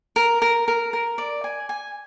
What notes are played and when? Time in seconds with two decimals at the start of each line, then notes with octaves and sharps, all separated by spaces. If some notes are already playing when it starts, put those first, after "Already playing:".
0.16 A#4
0.42 A#4
0.68 A#4
0.93 A#4
1.18 D5
1.44 G#5
1.69 G#5